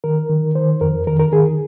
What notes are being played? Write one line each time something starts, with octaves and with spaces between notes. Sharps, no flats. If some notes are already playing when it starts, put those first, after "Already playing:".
D#3 A#4
D#3
D#3 C5
F2 A#4
D#3 A#4
A#4
D#3 G#4